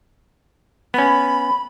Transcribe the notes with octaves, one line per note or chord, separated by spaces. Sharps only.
B3 C#4 B5